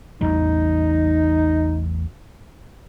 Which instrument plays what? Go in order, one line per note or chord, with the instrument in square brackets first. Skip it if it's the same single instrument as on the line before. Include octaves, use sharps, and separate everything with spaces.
[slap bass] A1 E2 G3 [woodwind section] D#4